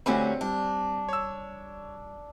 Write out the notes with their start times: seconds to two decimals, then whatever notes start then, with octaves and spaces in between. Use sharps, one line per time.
0.06 D2 F#3 G3 C4 C#4 F#5 B5
0.41 G3 D4
1.09 C#5 E6